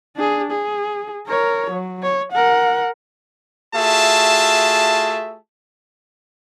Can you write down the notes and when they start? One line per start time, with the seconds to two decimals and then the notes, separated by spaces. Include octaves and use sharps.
0.16 D4 G#4
0.51 G#4
1.27 A#4 C#5
1.71 F#3
2.03 C#5
2.33 A#4 F#5
3.75 A3 F4 F#4 G#4 E5 A5